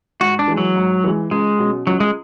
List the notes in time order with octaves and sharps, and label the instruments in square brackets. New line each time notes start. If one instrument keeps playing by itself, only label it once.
[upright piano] G#2 [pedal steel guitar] F#4
[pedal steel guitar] D4
[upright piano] E3 G#3
[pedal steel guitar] F#3
[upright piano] G#2
E3 G#3
[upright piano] C#2 [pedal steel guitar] G#3
[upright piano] B2 F#3 C#4
[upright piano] C#2 [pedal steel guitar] F#3
[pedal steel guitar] G#3